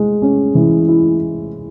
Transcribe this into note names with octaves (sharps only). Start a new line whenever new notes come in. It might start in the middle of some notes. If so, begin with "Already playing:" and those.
Already playing: G#3
C#4
E3
E4